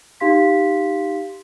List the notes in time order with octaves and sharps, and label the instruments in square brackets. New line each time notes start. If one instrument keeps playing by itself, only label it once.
[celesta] D#4 G4 F5 C6 B6